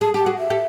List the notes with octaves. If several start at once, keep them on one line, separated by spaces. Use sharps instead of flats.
G#4 A5
G4 A5
F#4 G#4
E5
G4 A4